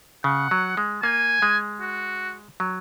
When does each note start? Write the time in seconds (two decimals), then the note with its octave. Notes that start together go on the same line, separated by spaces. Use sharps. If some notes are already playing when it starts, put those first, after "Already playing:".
0.24 C#3 F#5
0.51 F#3
0.77 G#3
1.03 A#3 G#5
1.42 G#3
1.81 F#4
2.60 F#3